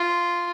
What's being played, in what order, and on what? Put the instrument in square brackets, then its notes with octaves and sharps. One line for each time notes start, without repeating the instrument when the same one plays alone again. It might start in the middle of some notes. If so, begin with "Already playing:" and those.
Already playing: [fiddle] F4